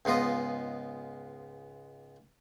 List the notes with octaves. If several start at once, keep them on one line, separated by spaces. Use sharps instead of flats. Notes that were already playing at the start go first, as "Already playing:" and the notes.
C#2 G#2 B3 F4 D#5